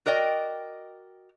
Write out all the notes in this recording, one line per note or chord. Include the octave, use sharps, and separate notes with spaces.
F#4 A#4 D5 D#5 G5